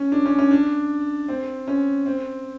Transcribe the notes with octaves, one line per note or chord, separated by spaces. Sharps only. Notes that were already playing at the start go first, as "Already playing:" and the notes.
Already playing: C#4
D4
C#4
C#4
D4
C4
C#4
C4